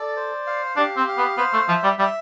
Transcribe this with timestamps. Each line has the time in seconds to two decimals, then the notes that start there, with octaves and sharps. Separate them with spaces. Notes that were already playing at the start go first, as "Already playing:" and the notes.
Already playing: A4 D5
0.16 C5
0.47 F5
0.76 D4 G4
0.97 C4
1.08 F5
1.18 B3
1.37 B3 C5
1.53 A3
1.68 F3 E5
1.83 G3
1.99 G3 E5